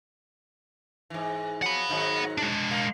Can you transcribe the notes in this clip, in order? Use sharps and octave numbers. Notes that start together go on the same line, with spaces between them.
G#2 E3
F3 F#3 F#5 B5
G#2 D#3 F#3
G#3 D4
A#3